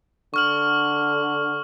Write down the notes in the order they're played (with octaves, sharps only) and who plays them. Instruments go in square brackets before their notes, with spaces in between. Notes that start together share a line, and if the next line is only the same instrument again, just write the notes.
[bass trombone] D3 [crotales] C#6 F6 F#7